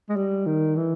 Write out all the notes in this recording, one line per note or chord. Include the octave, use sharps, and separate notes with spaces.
G#3
G3
D#3
E3